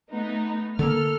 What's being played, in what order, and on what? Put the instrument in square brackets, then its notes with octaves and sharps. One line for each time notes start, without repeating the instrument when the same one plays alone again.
[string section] A3 B3 D#4
[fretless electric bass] D3 A#3 [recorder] A4 [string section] F6